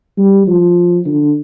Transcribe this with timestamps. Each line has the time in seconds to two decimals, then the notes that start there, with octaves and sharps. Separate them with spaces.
0.17 G3
0.47 F3
1.05 D3